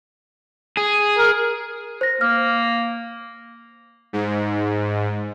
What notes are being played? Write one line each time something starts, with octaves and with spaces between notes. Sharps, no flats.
G#4
A#4
C5 A#6
A#3 F6
G#2